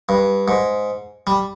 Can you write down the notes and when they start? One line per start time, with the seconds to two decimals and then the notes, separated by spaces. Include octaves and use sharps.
0.09 G2
0.48 G#2
1.27 G3